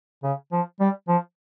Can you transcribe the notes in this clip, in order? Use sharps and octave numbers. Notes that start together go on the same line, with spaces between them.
C#3
F3
G3
F3